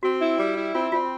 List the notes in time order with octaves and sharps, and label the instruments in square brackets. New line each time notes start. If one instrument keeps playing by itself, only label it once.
[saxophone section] C4 [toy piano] F#4
[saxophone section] E4
G3
E4
[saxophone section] C4 [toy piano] F4
[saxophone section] C4 [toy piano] F4